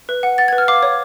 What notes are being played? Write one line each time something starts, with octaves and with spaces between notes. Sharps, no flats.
B4
F#5
F#5 A6
G#6
B4
F6
F5 D6
C#5